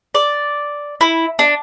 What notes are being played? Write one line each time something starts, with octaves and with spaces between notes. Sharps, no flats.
D5
E4
D4